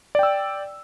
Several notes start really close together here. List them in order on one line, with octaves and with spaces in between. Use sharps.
D5 G5 E6